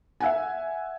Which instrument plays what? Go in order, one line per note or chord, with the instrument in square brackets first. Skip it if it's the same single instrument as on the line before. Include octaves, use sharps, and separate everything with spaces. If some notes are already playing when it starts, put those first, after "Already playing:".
[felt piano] E5 F#5 G#5